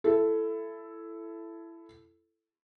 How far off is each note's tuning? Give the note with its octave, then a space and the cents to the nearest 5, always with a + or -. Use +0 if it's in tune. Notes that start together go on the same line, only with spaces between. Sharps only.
E4 +20 A4 +0